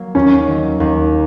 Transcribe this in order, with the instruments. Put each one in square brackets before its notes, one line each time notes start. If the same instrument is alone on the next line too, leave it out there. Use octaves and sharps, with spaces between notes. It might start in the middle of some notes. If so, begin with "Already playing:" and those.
Already playing: [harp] F#3 A#3
[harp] D#2 [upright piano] C#4
[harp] D#3 F#3
D#2